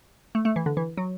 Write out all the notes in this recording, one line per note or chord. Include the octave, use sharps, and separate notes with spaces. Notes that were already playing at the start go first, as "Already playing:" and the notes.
A3
A3
E3
D3
E3
F#3